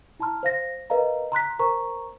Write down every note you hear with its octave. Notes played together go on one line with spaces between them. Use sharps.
E4 A5 A#5 C6 F6
C5 F5 A#6
A#4 B4 D#5 F5 A#5
A#5 C6 F#6 B6
A#4 C5 A#5 C#6